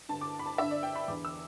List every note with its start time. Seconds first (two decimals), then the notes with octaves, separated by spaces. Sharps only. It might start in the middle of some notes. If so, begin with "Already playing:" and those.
0.09 G2 D3 A5
0.21 D6
0.39 B5
0.46 A5
0.58 G2 D3 E5
0.71 D5
0.83 G5
0.96 B5
1.08 E2 D3 D6
1.25 E6